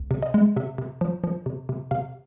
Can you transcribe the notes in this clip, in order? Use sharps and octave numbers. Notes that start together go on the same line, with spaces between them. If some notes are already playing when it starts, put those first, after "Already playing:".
Already playing: C#2
C3
D#5
G#3
C3 E5
C3
F3
F3
C3
C3
C3 F5